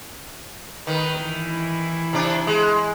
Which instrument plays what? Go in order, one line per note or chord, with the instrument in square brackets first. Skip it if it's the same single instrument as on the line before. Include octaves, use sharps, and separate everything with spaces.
[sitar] D#3 [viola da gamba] B4
[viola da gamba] E3 E4
[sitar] C3 D4
G#3